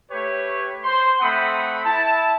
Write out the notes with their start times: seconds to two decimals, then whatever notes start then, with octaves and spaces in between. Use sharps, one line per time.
0.11 A3 G4 B4 C#5
0.84 C5 C6
1.20 A3 C4 F#5 B5 D#6
1.85 E4 A5